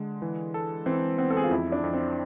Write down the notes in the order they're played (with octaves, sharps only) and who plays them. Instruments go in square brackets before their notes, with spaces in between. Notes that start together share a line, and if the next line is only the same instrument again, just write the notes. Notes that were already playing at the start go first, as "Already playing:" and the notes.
Already playing: [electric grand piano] D3 G#3
E3
A4
[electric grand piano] E3 [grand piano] C4
[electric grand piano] B3 [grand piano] C4
[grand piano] A4
G#4
F4
[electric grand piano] F2 [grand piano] E4
[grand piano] D4
[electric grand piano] F2
[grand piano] C4